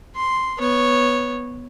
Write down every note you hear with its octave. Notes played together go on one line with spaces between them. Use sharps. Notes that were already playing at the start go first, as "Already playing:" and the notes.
C6
B3 C#5